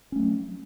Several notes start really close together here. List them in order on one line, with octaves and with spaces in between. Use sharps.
C#4 A3 F#3